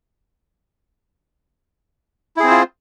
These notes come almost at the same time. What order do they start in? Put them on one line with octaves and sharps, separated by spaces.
E4 G#4 C4 C5 F4